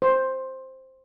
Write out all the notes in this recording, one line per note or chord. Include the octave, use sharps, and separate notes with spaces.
C5